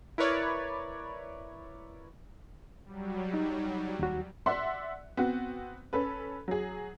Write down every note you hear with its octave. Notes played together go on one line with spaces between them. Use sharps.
E4 A#4 B4 C#5 D5
F#3 G3
D#4
D#2 F#4
D5 E5 F#5 C6 E6 F#6
B3 C4 F#4
C#4 A4 B4
F#3 G#4